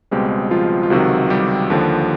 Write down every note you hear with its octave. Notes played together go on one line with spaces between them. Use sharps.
C#2 B2 G3 G#3 C4 G4
F3 F4
F4
C#2 C3 D#3 F#3 F#4
G3 G4
D#2 D3 F3